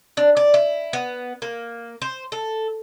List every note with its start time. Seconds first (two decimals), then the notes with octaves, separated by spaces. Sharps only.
0.17 D4
0.37 D5
0.54 E4
0.93 B3
1.42 A#3
2.02 C5
2.32 A4